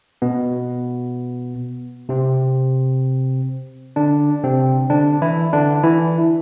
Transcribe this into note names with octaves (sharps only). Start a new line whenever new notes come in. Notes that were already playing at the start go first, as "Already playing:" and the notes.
B2 B3
C3 C4
D3 D4
C3 C4
D3 D4
E3 E4
D3 D4
E3 E4